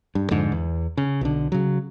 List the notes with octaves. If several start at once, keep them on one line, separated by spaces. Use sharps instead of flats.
G2
F2 G#2 D3
E2
C#3
B1 D3
C#3 F#3